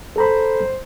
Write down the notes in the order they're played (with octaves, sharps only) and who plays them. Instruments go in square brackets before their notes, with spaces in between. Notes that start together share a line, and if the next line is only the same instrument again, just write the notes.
[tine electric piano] A4 A#5 B5 [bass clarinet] C5